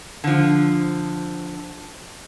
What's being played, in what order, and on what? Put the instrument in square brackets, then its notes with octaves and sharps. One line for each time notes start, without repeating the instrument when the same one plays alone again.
[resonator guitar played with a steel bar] D3 F3